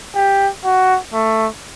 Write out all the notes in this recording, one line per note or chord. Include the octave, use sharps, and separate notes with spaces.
G4
F#4
A3